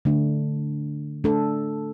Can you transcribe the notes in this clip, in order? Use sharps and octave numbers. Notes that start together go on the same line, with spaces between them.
D3 A3 D4
A3 D4 A4